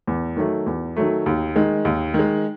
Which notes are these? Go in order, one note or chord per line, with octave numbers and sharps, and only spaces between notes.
E2
D#3 F#3 A3
E2
D#3 F#3 A3
D#2
D#3 G#3
D#2
D#3 G#3